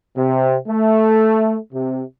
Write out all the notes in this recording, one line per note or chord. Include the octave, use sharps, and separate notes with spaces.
C3
A3
C3